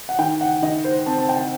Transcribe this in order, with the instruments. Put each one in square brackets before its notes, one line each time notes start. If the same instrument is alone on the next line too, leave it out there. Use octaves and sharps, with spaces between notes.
[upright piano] F#5
D#3 G5
F#5
D#3 D#5
C5
C4 A5
A5
G5